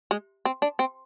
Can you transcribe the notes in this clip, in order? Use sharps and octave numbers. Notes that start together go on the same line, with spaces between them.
G#3
C4
D4
C4